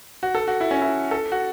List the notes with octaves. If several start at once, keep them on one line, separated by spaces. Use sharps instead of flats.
F#4
A4
F#4
E4
C#4
E4
A4
F#4